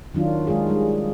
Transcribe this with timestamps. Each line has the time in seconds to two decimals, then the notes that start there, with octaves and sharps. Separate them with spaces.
0.15 D#3 F#3 D4 F4
0.47 G#3 D#4 F4 G#4
0.67 G3 G#3